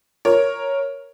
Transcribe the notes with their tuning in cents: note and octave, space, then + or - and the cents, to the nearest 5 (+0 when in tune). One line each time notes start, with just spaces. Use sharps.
A#4 +0 C#5 +0